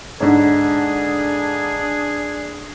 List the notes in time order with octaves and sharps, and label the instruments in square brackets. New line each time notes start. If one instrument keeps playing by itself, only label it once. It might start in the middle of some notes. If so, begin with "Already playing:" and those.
[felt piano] G#2 D3 [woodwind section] D4 G#4